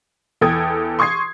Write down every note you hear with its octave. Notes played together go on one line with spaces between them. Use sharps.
E2 A4 G5 D#6 G#6
C6 C#6 D#6 G#6 C7